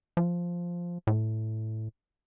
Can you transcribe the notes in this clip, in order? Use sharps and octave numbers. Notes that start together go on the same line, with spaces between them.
F3
A2